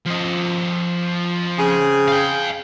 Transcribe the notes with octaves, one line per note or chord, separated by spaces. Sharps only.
F3 D#5
C#3 C4 G#4
F5 G5